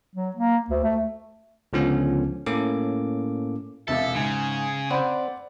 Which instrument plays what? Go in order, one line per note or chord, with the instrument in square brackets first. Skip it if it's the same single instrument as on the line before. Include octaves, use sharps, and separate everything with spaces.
[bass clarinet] F#3
A#3
D2
A3
[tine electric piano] C#2 D3 F3 B3 C#4
A2 A#3 C#4 A4 D6
[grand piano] E1 C3 F5 [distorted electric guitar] A4 [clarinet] E5
[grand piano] G#2 [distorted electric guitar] C#3 [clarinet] G#5
[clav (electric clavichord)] C4 C5 [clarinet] D5 [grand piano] F#5 B5